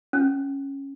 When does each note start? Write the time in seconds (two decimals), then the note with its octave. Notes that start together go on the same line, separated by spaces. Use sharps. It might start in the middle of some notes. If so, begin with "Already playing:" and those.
0.13 C#4